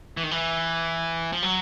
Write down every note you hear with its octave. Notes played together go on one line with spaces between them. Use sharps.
E3
D#3
E3
F3
F#3